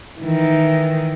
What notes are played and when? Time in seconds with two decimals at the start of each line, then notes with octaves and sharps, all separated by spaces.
0.20 D#3 E3